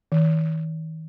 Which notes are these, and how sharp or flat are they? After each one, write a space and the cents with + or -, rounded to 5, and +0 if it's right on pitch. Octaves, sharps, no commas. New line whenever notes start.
D#3 +40